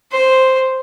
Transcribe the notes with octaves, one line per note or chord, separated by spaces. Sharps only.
C5